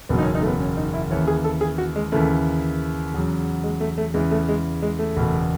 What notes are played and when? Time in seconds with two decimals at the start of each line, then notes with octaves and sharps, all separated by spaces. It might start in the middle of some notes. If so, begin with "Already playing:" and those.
0.09 F#1 E2 B2 F#3 B3
0.18 D#4
0.22 C#4
0.35 D#4
0.42 A3
0.47 B3
0.60 C#4
0.77 D#4
0.94 E4
1.11 D#2 C#3 E3 C#5
1.27 G#4
1.44 A4
1.61 G#4
1.78 F#4
1.96 G#3
2.12 D#2 C#3 E3 A3
3.14 E2 C#3 F#3
3.64 G#3
3.80 A3
3.98 A3
4.14 E2 C#3 E3 G#3
4.31 A3
4.49 G#3
4.82 G#3
4.99 A3
5.16 F#1 E2 B2